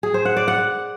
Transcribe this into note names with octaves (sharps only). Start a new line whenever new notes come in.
G#4
C5
F#5
D5
F#5